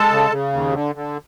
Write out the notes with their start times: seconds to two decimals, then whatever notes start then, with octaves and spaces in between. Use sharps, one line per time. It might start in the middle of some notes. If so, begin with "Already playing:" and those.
Already playing: G#3 A4 A5
0.10 C#3
0.31 C#3
0.53 D#2
0.73 D3
0.95 D3